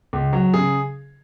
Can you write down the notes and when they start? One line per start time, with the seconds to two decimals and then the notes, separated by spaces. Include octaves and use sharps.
0.13 C#2
0.33 F#3
0.54 C#3 G#4